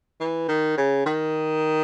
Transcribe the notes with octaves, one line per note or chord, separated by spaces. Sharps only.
E3
D#3
C#3
D#3